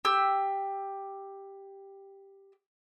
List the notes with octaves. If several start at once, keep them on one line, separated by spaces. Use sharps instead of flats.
G4 E6